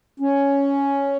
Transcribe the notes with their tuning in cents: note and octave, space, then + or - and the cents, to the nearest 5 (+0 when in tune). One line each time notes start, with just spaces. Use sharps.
C#4 +5